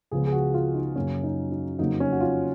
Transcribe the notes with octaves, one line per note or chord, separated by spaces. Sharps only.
C#2 C#3 F3 B3 G#4
G#4
F#4
F4
D#4
F#2 C#3 F#3 A#3 C#4
D#4
D#4
F2 C#3 F#3 A#3 D#4
C#4
F#4
F4